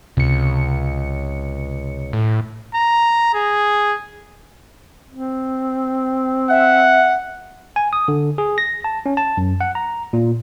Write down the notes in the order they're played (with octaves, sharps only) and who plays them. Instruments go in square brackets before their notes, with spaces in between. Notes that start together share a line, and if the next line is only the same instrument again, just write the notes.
[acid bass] C#2 [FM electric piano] C3 C#7
[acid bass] A2
[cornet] A#5
G#4
[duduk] C4
[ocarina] E5 [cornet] F#5
[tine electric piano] G#5
D#6
D3
G#4
A#6
A5
C#4
A5
F#2
F#5
A#5
A#2